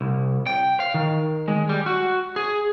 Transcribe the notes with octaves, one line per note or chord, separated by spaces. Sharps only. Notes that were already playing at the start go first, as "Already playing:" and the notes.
C2
G5
F5
D#3
G#3
G3
F#4
G#4